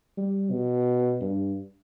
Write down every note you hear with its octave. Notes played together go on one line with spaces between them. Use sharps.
G3
B2
G2